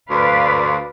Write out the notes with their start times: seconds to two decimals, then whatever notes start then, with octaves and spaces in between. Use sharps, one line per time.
0.10 D2 B4 D5 F5